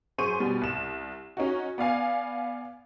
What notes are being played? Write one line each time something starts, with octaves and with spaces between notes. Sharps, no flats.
F#2 G#4 C5 C#6 D#7
B2 G3
C2 E7
C#4 D#4 F#4
B3 D5 F5 G#5